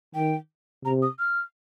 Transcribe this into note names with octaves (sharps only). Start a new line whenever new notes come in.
D#3 G5
C3 A#5
D#6
F6